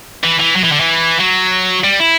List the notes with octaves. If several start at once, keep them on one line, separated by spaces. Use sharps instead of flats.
E3
E3
F#3
E3
D3
E3
F#3
G3
E4